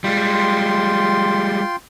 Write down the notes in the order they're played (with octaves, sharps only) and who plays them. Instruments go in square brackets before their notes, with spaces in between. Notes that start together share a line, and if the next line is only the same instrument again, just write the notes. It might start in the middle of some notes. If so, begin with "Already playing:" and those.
[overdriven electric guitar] G3 G#3 [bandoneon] F4 G5 C6